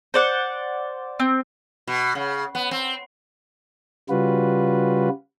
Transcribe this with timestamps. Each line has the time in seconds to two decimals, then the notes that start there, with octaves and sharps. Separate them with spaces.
0.14 C5 D5 F#5
1.20 C4
1.87 B2
2.15 C#3
2.55 B3
2.71 C4
4.09 C#3 G3 F4 F#4 B4